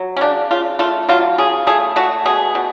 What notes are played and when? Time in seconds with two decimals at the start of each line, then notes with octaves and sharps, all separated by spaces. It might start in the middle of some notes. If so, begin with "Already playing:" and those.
Already playing: F#3
0.17 C#4
0.21 C#3 D4
0.51 C#3 F4
0.79 A3 F4
1.09 F#3 F4
1.38 C#3 G#4
1.67 A3 G#4
1.96 A3 F#4
2.26 B2 G#4
2.55 B2